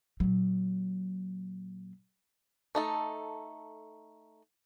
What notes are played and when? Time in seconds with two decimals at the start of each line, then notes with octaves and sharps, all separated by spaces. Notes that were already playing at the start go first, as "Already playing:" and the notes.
0.20 A#2 F#3
2.75 A3 D#4 A4